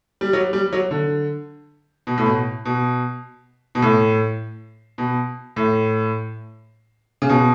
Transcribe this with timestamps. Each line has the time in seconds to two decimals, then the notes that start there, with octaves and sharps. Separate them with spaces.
0.21 G3
0.33 F#3
0.53 G3
0.73 F#3
0.91 D3
2.07 B2
2.18 A2
2.26 B2
2.65 B2
3.75 B2
3.82 A2
4.98 B2
5.56 A2
7.22 C#3
7.29 B2